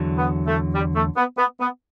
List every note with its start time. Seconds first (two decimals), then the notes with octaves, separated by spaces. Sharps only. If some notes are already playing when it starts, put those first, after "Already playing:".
Already playing: E2 D3 F#3
0.18 B3
0.47 A3
0.74 G3
0.95 A3
1.17 B3
1.38 B3
1.60 B3